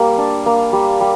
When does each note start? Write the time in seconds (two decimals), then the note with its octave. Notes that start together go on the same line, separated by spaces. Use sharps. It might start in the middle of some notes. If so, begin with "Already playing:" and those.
Already playing: G3 A#3
0.18 D4
0.46 A#3
0.73 G3
1.01 G3